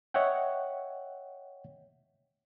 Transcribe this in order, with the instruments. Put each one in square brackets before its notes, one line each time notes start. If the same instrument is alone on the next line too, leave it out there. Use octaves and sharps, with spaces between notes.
[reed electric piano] C#5 D#5 E5 F#5 G5